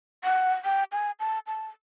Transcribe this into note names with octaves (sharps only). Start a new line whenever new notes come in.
F#5
G5
G#5
A5
A5